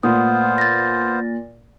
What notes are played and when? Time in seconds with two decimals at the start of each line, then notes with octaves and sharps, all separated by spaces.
0.03 A#2 A3 B3 F4 C5 F#5 D#6
0.58 A6 A#6